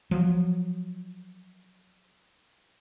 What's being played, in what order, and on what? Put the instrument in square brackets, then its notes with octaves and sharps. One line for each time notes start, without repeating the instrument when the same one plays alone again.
[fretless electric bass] F3 F#3